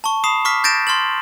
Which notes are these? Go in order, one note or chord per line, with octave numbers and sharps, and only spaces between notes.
A5 C#6
B5 D#6 C7 E7
C#6 D6 F6 B6
G6 A6 A#6 D7 E7
C6 F6 A6 F#7